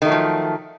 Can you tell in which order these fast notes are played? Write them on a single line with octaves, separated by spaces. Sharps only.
D#3 A3 F#3 F3